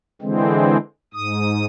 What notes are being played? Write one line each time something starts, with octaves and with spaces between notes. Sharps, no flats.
D3 E3 G#3 C4
G#2 D#6